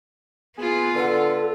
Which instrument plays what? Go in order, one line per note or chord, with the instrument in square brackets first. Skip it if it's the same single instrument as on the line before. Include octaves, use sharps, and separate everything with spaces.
[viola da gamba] B3 F4 [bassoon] G#4
[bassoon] D3 [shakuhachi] A4 [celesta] B4 F#5